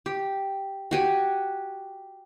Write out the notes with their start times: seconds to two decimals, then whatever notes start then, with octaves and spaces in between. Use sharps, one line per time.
0.06 G4
0.91 F#4 G4 G#5